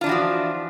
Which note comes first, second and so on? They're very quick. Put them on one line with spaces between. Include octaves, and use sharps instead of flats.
F4 D4 E3 F#4 F3